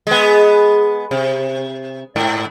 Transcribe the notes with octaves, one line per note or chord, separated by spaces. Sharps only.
G#3 B3
C3
G#2